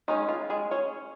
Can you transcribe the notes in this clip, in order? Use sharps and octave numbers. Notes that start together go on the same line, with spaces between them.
D#3 G#3 C#4 D#4
F4
G#3 G#4
C#4 C#5